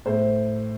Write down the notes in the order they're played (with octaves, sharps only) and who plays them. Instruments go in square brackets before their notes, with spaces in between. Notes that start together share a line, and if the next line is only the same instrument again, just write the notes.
[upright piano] A2 C5